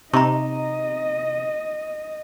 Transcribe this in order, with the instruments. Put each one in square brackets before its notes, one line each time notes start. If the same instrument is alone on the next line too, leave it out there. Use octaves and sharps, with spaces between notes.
[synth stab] C3 [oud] D#4 [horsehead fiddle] D#5 [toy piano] A#5 C#6